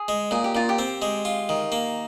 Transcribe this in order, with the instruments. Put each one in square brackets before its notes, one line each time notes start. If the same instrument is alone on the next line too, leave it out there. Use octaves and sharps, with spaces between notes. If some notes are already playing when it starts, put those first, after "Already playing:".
Already playing: [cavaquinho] G#4
[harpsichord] G#3
[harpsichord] A#2 [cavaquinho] G#4
[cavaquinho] G4
[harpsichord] A#2 [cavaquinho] F4
[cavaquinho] G4
[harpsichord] C4
G#3
F4
D#3
A#3